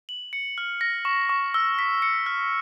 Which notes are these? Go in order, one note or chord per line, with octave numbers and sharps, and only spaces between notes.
F#7
C#7
F6
A#6
C#6
C#6
E6
B6
C#7
F6